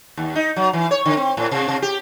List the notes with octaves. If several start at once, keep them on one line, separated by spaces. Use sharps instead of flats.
D#2
D#4
F#3
E3
C#5
D3
C4
A2
C3
C3
G4